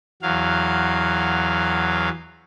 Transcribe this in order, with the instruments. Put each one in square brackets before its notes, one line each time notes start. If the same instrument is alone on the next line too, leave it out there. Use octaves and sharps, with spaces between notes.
[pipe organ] E2 F#3 F5